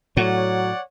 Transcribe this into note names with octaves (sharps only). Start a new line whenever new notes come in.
A2 F#3 C#5 D5 F#5